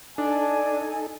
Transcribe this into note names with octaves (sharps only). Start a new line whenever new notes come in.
D4 D#4 A4 G#5